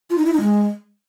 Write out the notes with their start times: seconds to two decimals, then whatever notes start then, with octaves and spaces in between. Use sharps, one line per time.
0.10 F4
0.18 D#4
0.25 E4
0.33 D#4
0.41 G#3